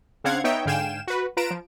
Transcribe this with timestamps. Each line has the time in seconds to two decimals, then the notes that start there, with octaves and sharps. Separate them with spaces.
0.24 C#3 C4 D4 F5 F#5 G#6
0.44 B3 D#4 C#5 E5 G5
0.66 G#2 D3 F5 G5 G#5 E7
1.07 F#4 B4
1.37 F4 B4 A#5 D7 E7
1.51 F3